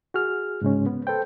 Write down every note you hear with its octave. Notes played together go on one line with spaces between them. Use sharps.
F#4 G#4 F6
G#2 C#3 G#3 C#4
B3
A4 B4 C5 G5